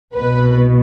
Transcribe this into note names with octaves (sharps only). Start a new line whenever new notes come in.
C2 B2 B4